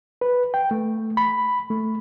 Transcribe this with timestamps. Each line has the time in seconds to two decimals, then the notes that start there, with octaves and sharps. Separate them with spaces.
0.21 B4
0.54 G5
0.71 A3
1.17 B5
1.70 A3